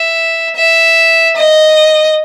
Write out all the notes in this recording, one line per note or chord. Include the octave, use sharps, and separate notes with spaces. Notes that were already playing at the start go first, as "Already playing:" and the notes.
Already playing: E5
E5
D#5